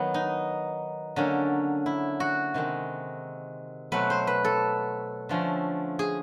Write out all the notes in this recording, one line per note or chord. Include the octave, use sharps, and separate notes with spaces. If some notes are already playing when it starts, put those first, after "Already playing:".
Already playing: D#3 F#3 B3
D#4
D3 F#3 A#3 C#4
E4
F#4
C3 D#3 G#3
B2 F#3 A3 C4 B4
C5
B4
A4
D3 F3 A3 C#4
G#4